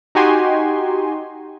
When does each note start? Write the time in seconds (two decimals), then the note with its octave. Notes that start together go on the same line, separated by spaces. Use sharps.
0.15 D#4 F#4 G4 G#5 C6